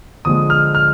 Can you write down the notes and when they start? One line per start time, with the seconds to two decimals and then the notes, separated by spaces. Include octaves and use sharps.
0.25 D3 F3 G#3 D#6
0.50 F6
0.75 F6